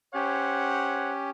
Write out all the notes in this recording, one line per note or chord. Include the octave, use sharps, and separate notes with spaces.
C#4 G4 C5 C#5 F#5